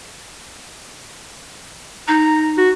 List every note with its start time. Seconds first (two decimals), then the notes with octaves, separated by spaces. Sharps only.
2.08 D#4 A#5
2.58 F#4